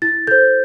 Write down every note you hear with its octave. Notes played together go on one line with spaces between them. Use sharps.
E4 A6
A4 C5 G6